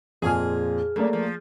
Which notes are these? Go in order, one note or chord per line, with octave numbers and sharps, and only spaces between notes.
F2 A#2 G#4 F6
F#2 A3 A#3 D5
F3